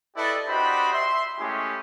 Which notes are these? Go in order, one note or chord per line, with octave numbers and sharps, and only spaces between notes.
E4 G4 A4 B4 D5 D#5
D4 F#4 G4 C5 D#5 B5
E5 C6
G#3 A3 C#4 E4 G4 G#4